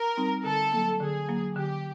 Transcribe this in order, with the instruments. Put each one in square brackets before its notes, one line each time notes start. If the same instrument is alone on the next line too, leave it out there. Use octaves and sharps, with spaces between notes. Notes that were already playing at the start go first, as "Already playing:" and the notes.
Already playing: [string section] A#4
[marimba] G3 C4 D#4
[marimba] D3 [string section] A4
[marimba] F#3 A#3
[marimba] D3 [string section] G#4
[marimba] F#3 A#3
[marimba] D3 [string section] G4